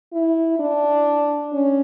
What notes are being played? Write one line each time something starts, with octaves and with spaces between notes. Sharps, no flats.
E4
D4
C#4